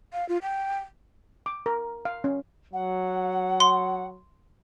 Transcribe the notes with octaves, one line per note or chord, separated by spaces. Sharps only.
F5
F4
G5
D6
A#4
F5
C#4
F#3 F#5
C6